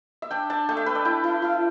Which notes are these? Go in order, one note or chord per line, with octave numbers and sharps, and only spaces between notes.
E5
D4 G5
D4 A5
A3 G5
E5
A3 B4
D5
E4 G5
E4
E4